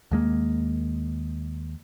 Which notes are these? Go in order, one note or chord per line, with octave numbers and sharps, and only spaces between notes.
D#2 G#3 A#3